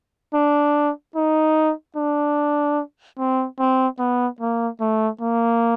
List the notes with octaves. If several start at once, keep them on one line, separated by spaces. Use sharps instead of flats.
D4
D#4
D4
C4
C4
B3
A#3
A3
A#3